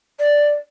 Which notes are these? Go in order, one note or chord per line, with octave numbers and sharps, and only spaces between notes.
D5